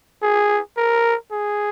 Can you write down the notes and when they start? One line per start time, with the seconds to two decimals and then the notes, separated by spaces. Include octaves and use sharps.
0.22 G#4
0.77 A#4
1.32 G#4